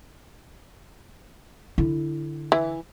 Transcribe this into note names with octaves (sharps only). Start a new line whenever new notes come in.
D3 E4
E3